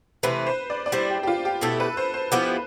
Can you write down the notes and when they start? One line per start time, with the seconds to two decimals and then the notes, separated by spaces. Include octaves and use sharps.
0.23 C3 E3 A3 C4 B4
0.46 C5
0.70 D5
0.86 D5
0.92 G3 C4 E4 C5
1.10 G4
1.23 G4
1.27 F4
1.45 G4
1.61 B2 A3 E4 G4 A4
1.80 B4
1.97 C5
2.14 C5
2.32 F3 B3 E4 G4 B4